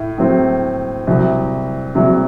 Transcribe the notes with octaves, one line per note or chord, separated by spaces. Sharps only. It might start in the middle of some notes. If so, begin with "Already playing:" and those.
Already playing: A2
A2 F#3 C4
C2 C3 F#3
C2 C3 F#3